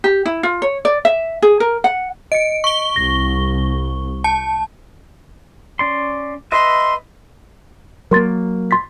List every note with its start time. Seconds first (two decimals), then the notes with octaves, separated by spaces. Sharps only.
0.04 G4
0.26 E4
0.43 F4
0.62 C#5
0.85 D5
1.05 E5
1.42 G#4
1.60 A#4
1.84 F#5
2.32 D#5 C#7 D7
2.64 C#6 G7
2.96 C2 A#6
4.24 A5 C#7
5.79 C#4 D5 C6
6.52 B4 D#5 E5 C6
8.11 F#3 A#3 A#4 C6 A6
8.71 C6 A6 B6